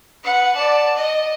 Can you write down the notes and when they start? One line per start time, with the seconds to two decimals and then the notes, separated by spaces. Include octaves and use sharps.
0.24 B4 F#5
0.55 D5 A5
0.97 D#5